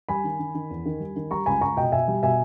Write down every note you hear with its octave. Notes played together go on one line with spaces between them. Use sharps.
G3 G#5 B5
D#3
D#3
D#3
E2
D#3
G3
D#3
G3 A#5 C#6
C#2 G#5 B5
C#2 A#5 C#6
B2 D#5 G5
B2 E5 G#5
G3
B2 E5 G#5